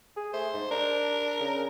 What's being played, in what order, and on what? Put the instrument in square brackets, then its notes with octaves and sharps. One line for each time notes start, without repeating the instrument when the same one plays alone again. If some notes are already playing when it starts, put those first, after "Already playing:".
[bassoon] G#4
[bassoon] A3 [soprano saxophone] C5
[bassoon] G#2
[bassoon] D4 [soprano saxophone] A#4
[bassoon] C#3